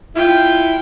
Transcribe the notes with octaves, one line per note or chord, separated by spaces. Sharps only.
E4 F4 G5